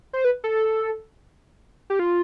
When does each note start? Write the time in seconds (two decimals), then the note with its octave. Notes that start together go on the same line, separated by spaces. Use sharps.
0.13 C5
0.25 B4
0.44 A4
1.90 G4
1.99 F4